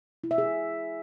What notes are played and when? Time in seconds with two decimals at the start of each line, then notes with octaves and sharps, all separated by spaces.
0.24 E4
0.31 E5
0.38 G#4